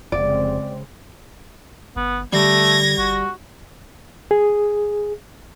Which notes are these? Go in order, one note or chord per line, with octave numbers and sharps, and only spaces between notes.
F1 C#3 G#3 C4 D5
G1 B3
D3 G3 A3 G#6 A#6
G1 F#4
G#4